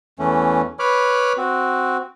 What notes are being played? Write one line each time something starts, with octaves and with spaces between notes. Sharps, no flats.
E2 E3 A3 C#4
B4 C#5 B5 D6 F6
C4 F#4